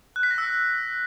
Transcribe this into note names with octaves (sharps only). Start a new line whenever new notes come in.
F#6
B6
A#6
E6